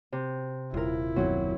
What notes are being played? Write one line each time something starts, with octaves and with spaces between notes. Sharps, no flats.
C3
D#1 E4 F4 A#4
F#1 D#2 B2 F#3 C4